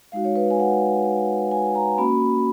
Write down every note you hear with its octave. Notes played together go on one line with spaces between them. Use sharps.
G#3 D#4 F#4 F5
C#5
B4
G#5
F#5
G#5
A#5
A#3 C#4 F#4 B5